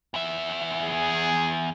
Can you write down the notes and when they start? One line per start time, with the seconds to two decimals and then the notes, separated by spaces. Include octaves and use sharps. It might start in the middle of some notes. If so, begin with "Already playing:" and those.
0.14 E2 E5
0.84 G#4